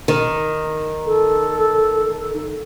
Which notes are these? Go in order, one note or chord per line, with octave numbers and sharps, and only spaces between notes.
D#3
A4